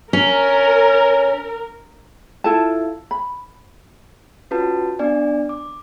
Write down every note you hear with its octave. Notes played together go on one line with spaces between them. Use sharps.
C#4 A#4
E4 F4 A4 A5
B5
C#4 F4 F#4 B4 A5
B3 D4 D5 G#5
D6